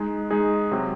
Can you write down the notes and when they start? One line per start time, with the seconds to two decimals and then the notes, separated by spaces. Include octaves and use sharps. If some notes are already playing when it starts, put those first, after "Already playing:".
Already playing: G#3 D#4 G#4
0.30 G#3 D#4 G#4
0.71 C3 F#3 C4